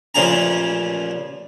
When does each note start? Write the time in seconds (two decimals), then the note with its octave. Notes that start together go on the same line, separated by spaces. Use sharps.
0.15 A1 A#2 C#3 F3 G#4 A#5